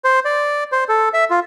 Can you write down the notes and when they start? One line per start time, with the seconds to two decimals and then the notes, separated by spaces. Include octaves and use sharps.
0.04 C5
0.25 D5
0.72 C5
0.89 A4
1.14 E5
1.30 F4